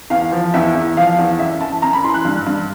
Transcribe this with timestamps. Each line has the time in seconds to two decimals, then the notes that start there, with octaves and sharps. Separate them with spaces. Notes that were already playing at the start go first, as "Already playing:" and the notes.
0.10 E2 F5
0.32 F3
0.54 E2 E5
0.75 E2
0.97 F3 F5
1.19 E2
1.39 F#2 E5
1.60 E3 A5
1.82 F#2 A#5
1.93 B5
2.04 E3 C6
2.14 F#6
2.25 G2
2.47 G2